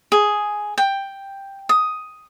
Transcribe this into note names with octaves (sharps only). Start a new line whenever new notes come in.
G#4
G5
D#6